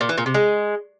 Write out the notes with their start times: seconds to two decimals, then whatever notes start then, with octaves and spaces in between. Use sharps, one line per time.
0.01 A#2
0.09 E3
0.18 A#2
0.26 C3
0.34 G#3